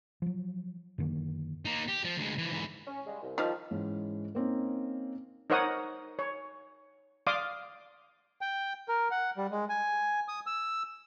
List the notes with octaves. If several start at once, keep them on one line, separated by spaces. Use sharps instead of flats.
F3 F#3
F#2 D3 D#3 A#3
A#3 D#4
G4
F3
D2 G#3
E3 F3
G#2 E3
C#4
C#3 G3 G#3
C2
D#3 F3 G3 D#4 F4
G#2 E3 C#4
A#3 C4 C#4 D#4
D#4 A#4 C5 C#5 F#5 D#6
C#5
D5 F5 C6 D6 D#6
G5
A#4
F#5
G3
G#3
G#5
D#6
E6